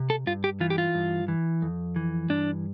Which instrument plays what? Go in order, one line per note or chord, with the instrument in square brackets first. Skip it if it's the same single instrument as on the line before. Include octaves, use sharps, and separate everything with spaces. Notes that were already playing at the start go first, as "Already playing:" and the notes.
Already playing: [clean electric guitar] C3
A4
G2 F4
G4
E3 F4
G4
F4
G2
E3
F2
E3
G2 D4